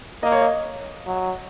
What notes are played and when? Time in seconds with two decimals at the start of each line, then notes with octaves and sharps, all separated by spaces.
0.23 A#3 D#5
0.32 C#5
0.42 D#5
1.06 F#3